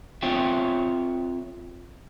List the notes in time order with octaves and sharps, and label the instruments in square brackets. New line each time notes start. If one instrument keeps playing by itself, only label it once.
[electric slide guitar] C4 F4 C5 C#5 E5 G5